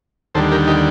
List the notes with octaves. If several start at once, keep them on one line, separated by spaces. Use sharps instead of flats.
D#2 D3 G3 A4 C5
G4 A#4
D#4 G4